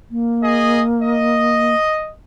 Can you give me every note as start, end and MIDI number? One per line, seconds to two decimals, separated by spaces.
0.11 1.75 58
0.42 0.81 68
0.42 0.81 75
1.02 2.10 75